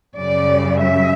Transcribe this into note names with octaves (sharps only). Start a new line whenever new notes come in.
F#2 C#3 G3 D5
E5